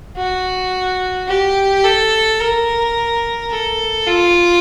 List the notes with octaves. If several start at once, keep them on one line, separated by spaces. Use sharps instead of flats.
F#4
G4
A4
A#4
A4
F4